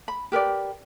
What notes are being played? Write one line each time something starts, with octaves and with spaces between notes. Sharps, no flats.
B5
G4 A#4 B4 D5